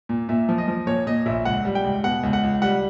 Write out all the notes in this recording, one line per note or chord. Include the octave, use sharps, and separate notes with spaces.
A#2
A#2 E5
F3
D#5
F3
A#2 C#5
A#2 D#5
A#1 E5
C#2 F#5
G3
G5
C#2
B2 F#5
C#2
F#5
C#2
G3 F#5